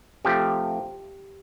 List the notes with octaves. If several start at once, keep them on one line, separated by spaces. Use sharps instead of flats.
C3 F3 A3 G4